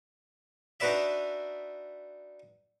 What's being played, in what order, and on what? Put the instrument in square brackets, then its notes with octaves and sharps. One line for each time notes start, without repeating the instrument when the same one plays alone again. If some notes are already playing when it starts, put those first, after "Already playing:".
[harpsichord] D4 D#4 F#4 B4 D5 E5